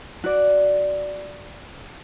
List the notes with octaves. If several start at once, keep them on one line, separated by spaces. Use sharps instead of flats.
F#4 D5